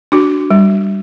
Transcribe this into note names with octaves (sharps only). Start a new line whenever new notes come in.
D4 F#4
G3